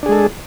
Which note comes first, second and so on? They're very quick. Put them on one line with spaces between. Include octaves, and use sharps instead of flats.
D4 G#4 G#3 A4